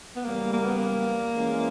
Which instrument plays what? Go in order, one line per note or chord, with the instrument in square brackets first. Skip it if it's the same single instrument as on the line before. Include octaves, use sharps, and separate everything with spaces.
[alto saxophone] B3
[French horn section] F#2 C#3 E3 G3 [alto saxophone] A#3
[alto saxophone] A#3
B3
A#3
[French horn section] E3 G#3 C#4